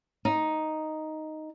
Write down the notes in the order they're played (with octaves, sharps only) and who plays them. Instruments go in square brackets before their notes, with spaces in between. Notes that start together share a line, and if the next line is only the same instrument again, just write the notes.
[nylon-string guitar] D#4